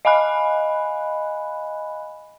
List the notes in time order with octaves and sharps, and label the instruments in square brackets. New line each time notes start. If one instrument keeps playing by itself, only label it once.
[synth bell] D#5 F5 G#5 B5 F#6